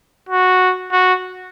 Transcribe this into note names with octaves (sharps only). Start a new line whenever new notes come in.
F#4
F#4